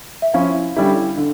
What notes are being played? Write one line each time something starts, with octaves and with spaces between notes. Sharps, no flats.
E5
F3 C#4 E4 F5
D3 G3 C#4 E4 G4
D3